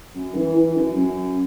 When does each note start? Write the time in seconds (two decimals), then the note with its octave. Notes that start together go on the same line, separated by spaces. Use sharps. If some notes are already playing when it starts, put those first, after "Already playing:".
0.15 F#2
0.35 E3
0.56 E3
0.76 F#2
0.97 F#2